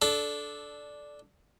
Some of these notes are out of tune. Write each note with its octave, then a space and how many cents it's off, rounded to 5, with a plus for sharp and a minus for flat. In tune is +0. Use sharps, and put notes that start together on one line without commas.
D4 +0 A4 -15